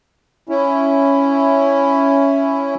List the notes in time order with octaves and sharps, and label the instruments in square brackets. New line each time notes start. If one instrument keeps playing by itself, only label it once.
[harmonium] C#4 E4